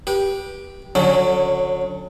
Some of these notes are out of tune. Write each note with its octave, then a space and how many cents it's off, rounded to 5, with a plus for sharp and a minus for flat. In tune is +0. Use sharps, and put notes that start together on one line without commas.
G4 +0 B4 -30
D3 +0 F#3 -35 C#4 +0